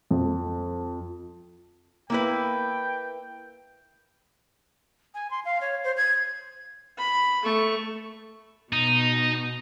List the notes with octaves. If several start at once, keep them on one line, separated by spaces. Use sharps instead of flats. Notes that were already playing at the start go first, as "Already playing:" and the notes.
F2
A#3 E4 B4 G5
G#5
C6
F5
C#5
C5
G#6
B5
A3 C#6
B2 D#4